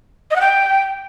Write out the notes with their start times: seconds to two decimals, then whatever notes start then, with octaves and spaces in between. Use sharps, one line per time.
0.31 D#5
0.36 F#5
0.41 G5